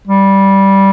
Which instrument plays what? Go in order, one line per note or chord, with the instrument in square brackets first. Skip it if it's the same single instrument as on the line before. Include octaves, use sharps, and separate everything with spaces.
[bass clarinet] G3